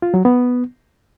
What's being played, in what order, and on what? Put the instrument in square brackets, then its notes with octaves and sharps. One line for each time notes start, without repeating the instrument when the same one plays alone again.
[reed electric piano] F4
F#3
B3